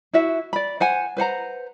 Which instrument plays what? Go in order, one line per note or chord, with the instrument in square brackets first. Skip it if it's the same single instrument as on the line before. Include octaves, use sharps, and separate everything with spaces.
[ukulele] E4 F#4 E5
D5 B5
C5 F#5 G#5
B4 C5 F#5 A#5